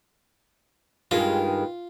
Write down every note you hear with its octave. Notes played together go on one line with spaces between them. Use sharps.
G2 D#3 G#3 F4